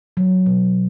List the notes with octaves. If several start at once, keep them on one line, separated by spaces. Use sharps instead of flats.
F#3
B2